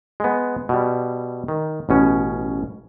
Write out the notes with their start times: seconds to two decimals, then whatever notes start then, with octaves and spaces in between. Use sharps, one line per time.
0.20 G#3 B3
0.69 B2 G3
1.48 D#3
1.89 A1 B2 C#4